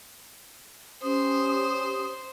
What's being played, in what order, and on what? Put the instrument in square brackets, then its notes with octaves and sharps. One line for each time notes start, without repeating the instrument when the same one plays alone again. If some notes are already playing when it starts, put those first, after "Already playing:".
[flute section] C#4 G4 D#6 [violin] C5